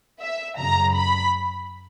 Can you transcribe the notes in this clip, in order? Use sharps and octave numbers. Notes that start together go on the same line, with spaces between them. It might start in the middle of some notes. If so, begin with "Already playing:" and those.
E5
F#2 C#3 F#3 A#5
B5